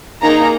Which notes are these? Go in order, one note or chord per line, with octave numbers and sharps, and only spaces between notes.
A#3 D#4 G#4 A#5